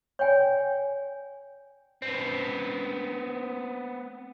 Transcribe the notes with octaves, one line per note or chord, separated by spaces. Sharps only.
C#5 D5 G5 G#5
B3 C4